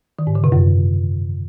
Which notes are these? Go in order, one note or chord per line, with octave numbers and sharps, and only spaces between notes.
D#3
G#2
D3
C3
F#2